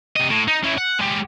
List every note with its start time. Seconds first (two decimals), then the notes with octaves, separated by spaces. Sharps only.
0.16 C3 D#5
0.30 A2
0.48 D#4
0.64 C#4 E4
0.78 F#5
0.99 G#3 G4